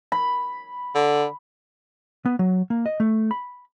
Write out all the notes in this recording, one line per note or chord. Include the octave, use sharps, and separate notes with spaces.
B5
D3
B3
F#3
A#3
D#5
A3
B5